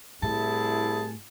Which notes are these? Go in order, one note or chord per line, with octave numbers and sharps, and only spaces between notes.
C2 A2 E4 G#4 A5